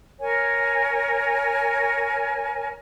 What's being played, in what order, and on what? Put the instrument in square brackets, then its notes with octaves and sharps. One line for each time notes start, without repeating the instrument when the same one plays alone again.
[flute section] A#4 C#5 G#5